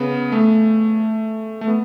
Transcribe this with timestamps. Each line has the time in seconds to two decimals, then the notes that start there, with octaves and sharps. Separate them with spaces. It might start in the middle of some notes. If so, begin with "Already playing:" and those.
Already playing: C#3 B3
0.32 A3
1.61 A3
1.67 B3